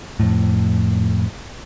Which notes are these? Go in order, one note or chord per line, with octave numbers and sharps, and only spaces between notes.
F2 A2